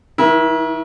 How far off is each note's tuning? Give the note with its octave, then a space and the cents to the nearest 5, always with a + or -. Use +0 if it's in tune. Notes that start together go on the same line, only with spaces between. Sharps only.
D#3 +40 E4 +0 A#4 +45